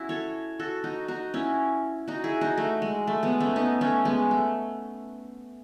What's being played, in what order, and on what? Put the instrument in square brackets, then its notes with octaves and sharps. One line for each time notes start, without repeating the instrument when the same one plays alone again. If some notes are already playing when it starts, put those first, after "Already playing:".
Already playing: [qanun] C#4 E4 F#4
A4 C#5
F#4 A4
D#4 F#4
D#4 F#4
C#4 E4
D#4 F#4
E4 G#4
D#4 F#4
A3
G#3
A3
G#3 B3
A3 C#4
B3 D#4
A3 C#4
G#3 B3
A3